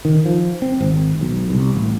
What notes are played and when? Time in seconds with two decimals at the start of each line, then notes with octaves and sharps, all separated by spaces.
0.05 D#3
0.25 F3
0.62 C4
0.81 G#1
1.21 B1
1.50 C2
1.75 A1